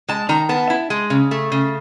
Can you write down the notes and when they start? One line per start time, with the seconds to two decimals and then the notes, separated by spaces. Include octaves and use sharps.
0.08 G#3 A5
0.29 D#3 A#5
0.49 B3 A5
0.70 E4
0.90 G#3
1.10 C#3
1.31 A3
1.52 C#3